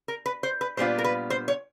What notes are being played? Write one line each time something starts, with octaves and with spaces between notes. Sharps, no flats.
A#4
B4
C5
B4
A#2 G3 B3 D4 F4 C5
A#4
B4
C5
C#5